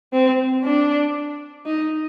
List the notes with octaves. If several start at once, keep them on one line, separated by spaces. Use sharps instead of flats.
C4
D4
D#4